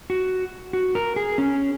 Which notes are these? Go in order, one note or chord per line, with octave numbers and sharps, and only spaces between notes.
F#4
F#4
A#4
G#4
C#4